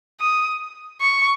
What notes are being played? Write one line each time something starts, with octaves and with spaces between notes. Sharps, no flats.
D#6
C#6